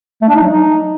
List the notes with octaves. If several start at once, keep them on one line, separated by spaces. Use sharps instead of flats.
A3
D4
D#4
F#3
D#4